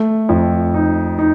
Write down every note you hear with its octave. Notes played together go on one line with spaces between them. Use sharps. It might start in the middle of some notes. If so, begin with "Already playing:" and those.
Already playing: A3
F2
D#4
D#4